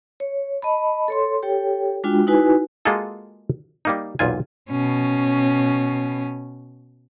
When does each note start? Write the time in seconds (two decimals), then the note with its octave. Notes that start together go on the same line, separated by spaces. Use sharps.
0.20 C#5
0.62 D#5 A5 B5
1.08 A4 C#5 C6
1.43 G4 A4 C#5 G5
2.04 G#3 D4 F4 F#4 G5
2.27 D#4 E4 F#4 B4 G#5
2.85 G#3 A#3 F4 F#4 G#4 A4
3.85 G3 A#3 D#4
4.19 B1 E2 A#2 F4 G#5
4.70 B2 C#4